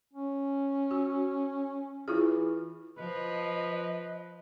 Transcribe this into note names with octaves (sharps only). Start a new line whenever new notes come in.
C#4
F#4
E3 E4 F4 G#4
F3 B4 D#5